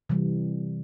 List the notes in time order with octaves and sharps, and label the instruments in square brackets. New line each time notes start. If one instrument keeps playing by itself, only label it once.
[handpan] C3 E3 G3